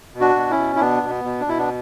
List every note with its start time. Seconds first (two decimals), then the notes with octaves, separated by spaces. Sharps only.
0.14 B2
0.20 D4 F#4
0.36 B2
0.50 C#4 E4
0.57 B2
0.76 E4
0.80 B2 B3 D4
1.03 B2
1.10 B3
1.24 B2
1.40 D4
1.46 B2 E4
1.58 B3 D4